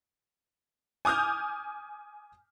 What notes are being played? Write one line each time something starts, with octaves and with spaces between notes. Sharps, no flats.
G#5 D6 D#6 F6 G6